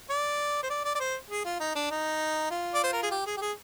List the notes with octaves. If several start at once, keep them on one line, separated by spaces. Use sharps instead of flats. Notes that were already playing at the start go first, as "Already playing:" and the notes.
D5
C5
D5
D5
D5
C5
G#4
F4
D#4
D4
D#4
F4
D5
C5
A#4
G#4
G4
G#4
G4
G#4